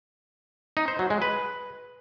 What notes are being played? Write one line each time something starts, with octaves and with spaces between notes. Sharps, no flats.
D#4
C5
F#3
G#3
B4